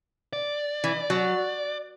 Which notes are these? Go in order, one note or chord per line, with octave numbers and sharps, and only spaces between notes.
D5
E3
F#3